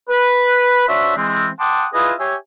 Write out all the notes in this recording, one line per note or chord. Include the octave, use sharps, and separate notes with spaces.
B4
D4 F#4 C5 C#5 E5
E3 G#3 C4
F#5 G5 A5 C6 D6 D#6
E4 F4 G#4 B4 D#5 D#6
G4 C#5 E5 G#5